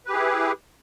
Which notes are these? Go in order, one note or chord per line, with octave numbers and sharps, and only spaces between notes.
E4 G4 G#4 B4